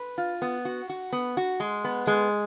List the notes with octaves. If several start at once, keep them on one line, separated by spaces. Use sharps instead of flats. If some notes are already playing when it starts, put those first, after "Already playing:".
Already playing: B4
F4
B3
F#4
F#4
B3
F#4
G#3
B3
G#3